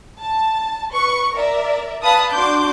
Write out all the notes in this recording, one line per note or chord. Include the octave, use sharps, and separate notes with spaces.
A5
B4 C#6
A#4 D5 E5
B4 F5 A5 B5 D#6
D4 F#4 C6 D6 G6